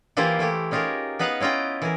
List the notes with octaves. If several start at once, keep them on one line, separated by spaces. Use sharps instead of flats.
E3 A#3 E4 F4 G4 C5
E3 A3 E4 G4
C#4 D#4 F4 G4 G#4 A#4
B3 D#4 B4 F5 F#5
C#4 E4 F4 D#5 G5
E3 G#4 A#4